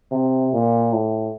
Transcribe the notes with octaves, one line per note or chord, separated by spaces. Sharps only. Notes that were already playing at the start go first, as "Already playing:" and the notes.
C3
A#2
A2